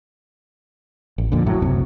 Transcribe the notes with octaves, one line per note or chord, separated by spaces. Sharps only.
A1
F2 A#2 D3
A2 F#3
C#2 F#2 C3